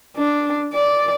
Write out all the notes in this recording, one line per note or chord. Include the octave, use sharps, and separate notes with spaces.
D4
D5